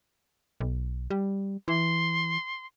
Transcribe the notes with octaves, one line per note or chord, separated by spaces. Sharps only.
B1
G3
E3 C6